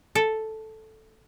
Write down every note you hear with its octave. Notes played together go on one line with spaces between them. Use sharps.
A4